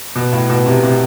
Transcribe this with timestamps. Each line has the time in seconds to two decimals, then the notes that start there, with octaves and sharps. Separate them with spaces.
0.15 B2
0.32 A2
0.49 B2
0.66 C3
0.83 C3